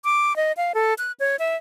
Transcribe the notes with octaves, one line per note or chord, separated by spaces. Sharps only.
D6
D#5
F5
A4
F#6
C#5
E5